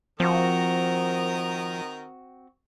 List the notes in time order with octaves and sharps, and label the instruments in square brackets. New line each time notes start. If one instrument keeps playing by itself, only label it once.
[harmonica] D#3 A#4 D#6 [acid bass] F3 [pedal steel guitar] C4 F#4